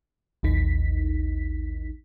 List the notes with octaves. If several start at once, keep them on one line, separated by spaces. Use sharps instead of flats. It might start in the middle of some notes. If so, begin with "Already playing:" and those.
A1 D#2 D#4 B6